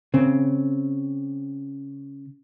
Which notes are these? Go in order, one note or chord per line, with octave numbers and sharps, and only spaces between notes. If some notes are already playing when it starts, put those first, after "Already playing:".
C#3 C4